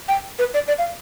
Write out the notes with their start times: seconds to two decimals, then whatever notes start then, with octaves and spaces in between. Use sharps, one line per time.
0.08 G5
0.39 B4
0.54 D5
0.68 D5
0.79 F5